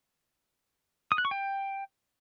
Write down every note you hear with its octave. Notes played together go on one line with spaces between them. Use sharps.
D#6
F#6
C#6
G5